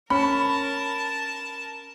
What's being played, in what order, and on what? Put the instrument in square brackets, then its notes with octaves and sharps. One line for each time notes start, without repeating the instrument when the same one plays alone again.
[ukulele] C#4 [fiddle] A#4 A5 [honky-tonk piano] B5